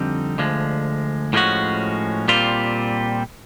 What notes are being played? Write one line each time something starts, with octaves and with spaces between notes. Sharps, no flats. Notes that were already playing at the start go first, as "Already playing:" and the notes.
Already playing: F2 D3 G3 C4 D#4
D2 D3 F3 G#3
A2 F3 G#3 C#4 F#4
A#2 G3 C4 F4